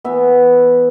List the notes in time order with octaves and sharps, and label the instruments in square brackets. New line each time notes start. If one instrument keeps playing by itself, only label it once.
[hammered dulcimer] E3 B3 E5